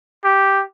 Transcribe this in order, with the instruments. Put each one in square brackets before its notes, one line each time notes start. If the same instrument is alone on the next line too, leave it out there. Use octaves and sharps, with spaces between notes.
[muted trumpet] G4